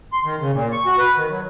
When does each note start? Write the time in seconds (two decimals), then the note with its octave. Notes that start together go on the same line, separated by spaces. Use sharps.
0.13 C6
0.24 D#3
0.40 C#3
0.54 A#2
0.72 C#6
0.86 F#4
0.98 B4
1.17 D#3
1.29 F#3